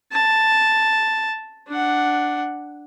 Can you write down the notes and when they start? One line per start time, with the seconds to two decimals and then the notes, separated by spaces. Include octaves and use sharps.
0.13 A5
1.68 D4 F#5